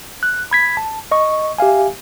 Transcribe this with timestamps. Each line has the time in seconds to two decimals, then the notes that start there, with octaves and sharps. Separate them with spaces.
0.23 F#6
0.51 B5 G#6 B6
0.77 A5
1.12 D#5 C#6
1.58 G4 E5 F5 G#5